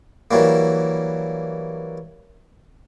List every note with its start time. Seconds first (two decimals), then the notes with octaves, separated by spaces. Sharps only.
0.31 E3 F#3 G3 A#3